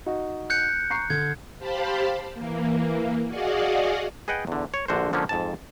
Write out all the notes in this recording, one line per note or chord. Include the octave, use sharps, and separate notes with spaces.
D#4 F#4
F#6 G6 C#7
A#5 C#6 C7
D3 G#6
G4 C5 F5 A5 B5
E3 A#3
F#4 G#4 D5 D#5 F5 F#5
G#4 B4 D#5 F#5 G5
E2 D3
C#5
A#1 D3 F#4 A#4 C5
D3 F3 G#3 A#3 C#4
F2 G#2 A5